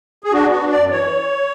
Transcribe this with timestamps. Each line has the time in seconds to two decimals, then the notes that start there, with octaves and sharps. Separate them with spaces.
0.24 G#4
0.32 D4 F#4
0.47 B3 F#4
0.61 D4
0.71 F#2 D5
0.91 E3 C#5